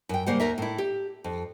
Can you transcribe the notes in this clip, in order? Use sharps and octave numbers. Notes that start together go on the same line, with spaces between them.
F#2 G5
C#3 G3 A#3 C5 F#5
D#2 A#4 E5
A2 E4
G4
F2